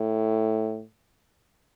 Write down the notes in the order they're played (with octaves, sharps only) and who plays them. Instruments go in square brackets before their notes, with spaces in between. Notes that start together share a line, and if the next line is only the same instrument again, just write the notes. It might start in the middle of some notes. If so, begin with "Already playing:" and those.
Already playing: [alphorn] A2